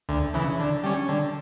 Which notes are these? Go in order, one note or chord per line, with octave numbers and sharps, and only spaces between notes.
D2
C#3 E3
D3
G3 C#4
D3